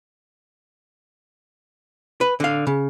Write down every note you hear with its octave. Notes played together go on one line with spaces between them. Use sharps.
B4
D3 F5
C#3